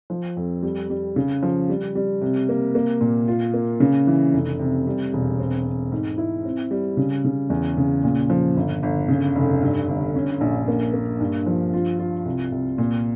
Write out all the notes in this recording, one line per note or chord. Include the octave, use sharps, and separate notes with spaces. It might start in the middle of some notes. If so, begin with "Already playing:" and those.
F3
F2
G3
G3
C#3
F3
G3
G3
C3
A#3
A#3
A#2
F4
A#3
C#3
E3
F1
C3
G3
E1
C4
C4
G#2
E4
C4
G3
C#3
C#3
E2
C#3
A#2
F3
G1
G1
C#3
F1
G2
G1
C#4
A#1
A#3
A#3
G2
F3
F4
F4
C2
C2
A#2